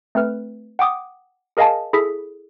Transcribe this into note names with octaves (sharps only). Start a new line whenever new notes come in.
A3 C4 B4 F6
F#5 G5 D6 D#6
G#4 A#4 D#5 F5 G#5 A5
E4 G#4 A4 B6